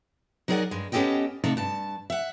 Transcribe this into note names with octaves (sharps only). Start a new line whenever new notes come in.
F#3 D#4 G#4 A#4 D5 F#5
G2 G#3
B3 C#4 G4 A4 D#5 G5
C3 A3 D#4 A4 F5
G2 A5
E5 F#5